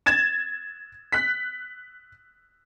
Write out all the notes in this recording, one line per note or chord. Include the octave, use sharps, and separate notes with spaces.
G#6 A6 E7
F#6 B6